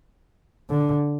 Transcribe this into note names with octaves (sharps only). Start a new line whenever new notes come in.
D3